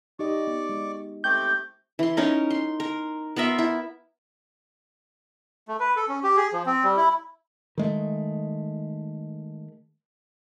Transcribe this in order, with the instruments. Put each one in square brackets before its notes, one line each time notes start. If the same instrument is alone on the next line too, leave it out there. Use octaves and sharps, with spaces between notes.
[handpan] D#4 G4 D#5 [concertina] D5 C#6 D6
[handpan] B3
G#3
[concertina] A3 C4 G4 [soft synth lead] G6
[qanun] E3 C6
C#4 D#4 A#4
C6
A#4
B3 F4 A#4 E5
E4
[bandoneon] A3
B4
A4
C#4
G4
G#4
F3
C4
G3
E4
[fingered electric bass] D#3 G#3 A3